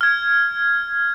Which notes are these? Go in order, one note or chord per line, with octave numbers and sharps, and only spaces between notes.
F6 G#6